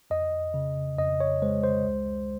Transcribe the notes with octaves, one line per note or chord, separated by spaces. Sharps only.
F2 D#5
C#3
F2 D#5
C#5
G#3 C5
C5
C#2